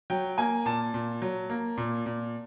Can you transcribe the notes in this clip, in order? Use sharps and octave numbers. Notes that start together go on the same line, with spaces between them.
F#3 G5
A#3 G#5
A#2 A5
A#2
F#3
A#3
A#2
A#2